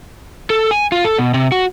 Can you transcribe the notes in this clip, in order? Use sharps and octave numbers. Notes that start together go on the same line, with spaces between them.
A4
G#5
F4
A4
B2
C3
F#4